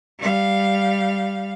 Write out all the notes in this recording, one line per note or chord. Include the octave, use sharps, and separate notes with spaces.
G3 F5